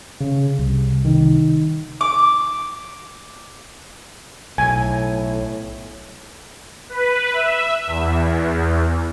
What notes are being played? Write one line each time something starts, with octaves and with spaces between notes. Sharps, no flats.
C#3
C2
D#3
D6
B1 A2 G#5
B4
E5
E2